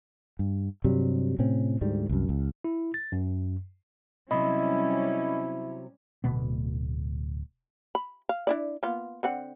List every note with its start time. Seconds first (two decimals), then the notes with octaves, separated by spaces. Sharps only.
0.39 G2
0.84 G2 C3 F#3 G3
1.39 A2 C3 C4 C#4
1.81 D2 G#2 G3
2.09 C2 F#2
2.29 C#2
2.64 E4
2.94 A6
3.12 F#2
4.31 C3 F#3 G3 C#4 E4 D#5 B5
6.24 D1 D2 B2 B3
7.95 B5
8.29 F5
8.47 D4 E4 D5
8.83 A#3 B3 F4
9.23 D3 C4 F#5